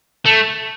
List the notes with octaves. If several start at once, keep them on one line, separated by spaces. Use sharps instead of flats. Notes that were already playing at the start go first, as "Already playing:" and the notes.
A3